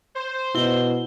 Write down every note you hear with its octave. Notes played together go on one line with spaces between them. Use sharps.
C5
B2 E4 G7